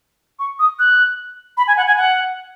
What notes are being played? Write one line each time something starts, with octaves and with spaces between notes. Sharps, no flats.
C#6
D#6
F#6
B5
G#5
F#5
G#5
F#5